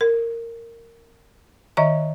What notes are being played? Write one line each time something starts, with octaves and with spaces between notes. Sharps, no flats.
A#4
D#3 D#5 E5 A#5